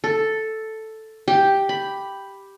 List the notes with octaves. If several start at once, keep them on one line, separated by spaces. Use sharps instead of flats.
A4
G4
B5